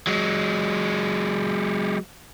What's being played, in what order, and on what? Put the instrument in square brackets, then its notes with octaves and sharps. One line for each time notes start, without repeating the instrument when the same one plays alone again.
[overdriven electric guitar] F#3 G#3